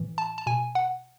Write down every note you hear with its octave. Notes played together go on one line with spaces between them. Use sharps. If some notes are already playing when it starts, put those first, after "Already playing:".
Already playing: A2 E3
A5
A5
B2 G#5
F#5